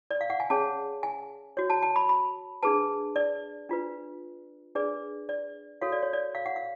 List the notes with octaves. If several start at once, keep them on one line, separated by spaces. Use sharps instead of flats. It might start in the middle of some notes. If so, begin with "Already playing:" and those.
D5
F5
F#5
G#5
C#4 G#4 C#5 A5
G#5
F#4 C#5
A5
A5
B5
B5
D4 G#4 B4 A5
D5
D4 F4 B4
D4 G#4 B4 D5
D5
F#4 A4 C#5 F5
D5
C#5
D5
F5
F#5
F5